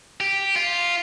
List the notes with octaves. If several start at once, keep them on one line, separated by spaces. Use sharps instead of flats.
G4
F4